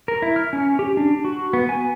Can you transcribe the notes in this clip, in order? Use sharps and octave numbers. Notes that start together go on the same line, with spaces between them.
A#4
E4
F6
C#4
G4
D4
F#4
B3
G#5